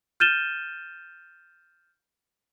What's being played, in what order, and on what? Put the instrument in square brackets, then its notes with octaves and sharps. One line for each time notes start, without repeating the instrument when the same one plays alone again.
[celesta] F6 G6 A6 D#7 E7 G7